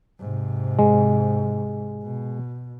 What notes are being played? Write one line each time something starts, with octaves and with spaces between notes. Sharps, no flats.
G#2 C3
G#3
B2